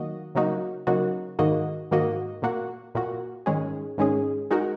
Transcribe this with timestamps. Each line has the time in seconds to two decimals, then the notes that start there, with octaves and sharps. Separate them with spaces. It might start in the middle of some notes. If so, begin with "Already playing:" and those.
Already playing: D#3 F#3 A#3 F#4 D#5
0.35 C#3 F#3 A#3 D#4 F#4
0.87 C#3 F#3 A#3 D#4 F#4
1.39 G#2 D#3 A#3 F#4 D#5
1.91 G#2 D#3 A#3 F#4 D#5
2.42 A#2 A#3 F#4
2.95 A#2 A#3 F#4
3.46 G#2 D#3 G#3 C#4 G#4
3.98 G#2 D#3 G#3 C#4 G#4
4.51 G#3 D#4 F#4 A#4